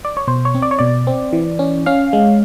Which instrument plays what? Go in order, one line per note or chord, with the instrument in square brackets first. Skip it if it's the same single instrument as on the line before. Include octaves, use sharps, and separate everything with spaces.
[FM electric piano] D5
C#5
B2 C5
C#5
C4
D5
C#5
B2 D5
C4
E3
C#4
C#4 F5
G#3